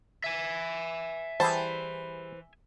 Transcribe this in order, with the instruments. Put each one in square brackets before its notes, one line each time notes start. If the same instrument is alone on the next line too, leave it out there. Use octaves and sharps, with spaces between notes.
[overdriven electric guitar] E5 G#5
[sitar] E3 C5 [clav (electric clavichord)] G3 E4 G#4 [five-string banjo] A5